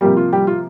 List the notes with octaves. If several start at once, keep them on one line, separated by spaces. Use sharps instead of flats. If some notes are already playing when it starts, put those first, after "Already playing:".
C3 F3 G3 A#3 G4
F4
G3 G4
F4